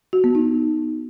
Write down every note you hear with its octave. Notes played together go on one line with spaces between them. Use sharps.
F#4
B3
D#4